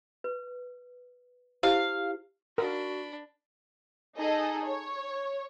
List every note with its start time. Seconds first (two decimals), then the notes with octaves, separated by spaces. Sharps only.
0.24 B4
1.63 E4 G4 C5 F5
2.58 D4 F#4 A#4 B5
4.17 D#4 G#4 A4 D#5
4.65 C#5